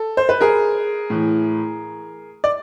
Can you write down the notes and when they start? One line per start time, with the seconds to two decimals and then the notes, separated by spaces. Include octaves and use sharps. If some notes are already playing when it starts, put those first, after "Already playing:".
Already playing: A4
0.17 C5
0.29 B4
0.41 G#4 A#4
1.10 A2 E3
2.44 D5